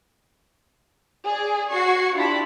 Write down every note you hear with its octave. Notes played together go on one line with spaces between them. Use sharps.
G#4 D5
F#4 C#6 G#6 C7
D4 E4 F4 G4 A5 B5